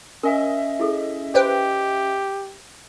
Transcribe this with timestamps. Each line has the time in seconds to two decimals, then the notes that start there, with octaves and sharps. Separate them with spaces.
0.23 C#4 A#4 D#5 E5 G#5
0.80 E4 G#4 A4
1.35 G4 B4 C5 G5